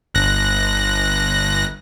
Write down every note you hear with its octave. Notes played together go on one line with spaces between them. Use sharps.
G1 F#6 A#6